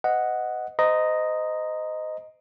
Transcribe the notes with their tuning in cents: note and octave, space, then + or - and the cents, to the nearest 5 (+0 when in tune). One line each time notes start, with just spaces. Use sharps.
C5 -45 D#5 +0 F#5 +0
C5 -35 D#5 +0 A#5 +0